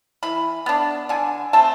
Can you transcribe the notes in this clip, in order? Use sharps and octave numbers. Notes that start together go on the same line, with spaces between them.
E3 B5
B3 D4
D3 G#5
A3 C4 A5